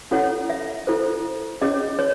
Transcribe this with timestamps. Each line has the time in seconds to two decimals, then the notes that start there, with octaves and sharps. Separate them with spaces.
0.11 C#4 E4 A4 C#5 F#5
0.50 E5
0.87 E4 A4 C5
1.61 C#4 G#4 C#5 D#5
1.99 C#5